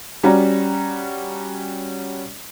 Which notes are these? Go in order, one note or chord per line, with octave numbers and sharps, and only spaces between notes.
G3 C#4 F#4 D5 A#5